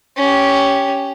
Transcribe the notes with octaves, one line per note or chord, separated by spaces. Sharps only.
C#4 G4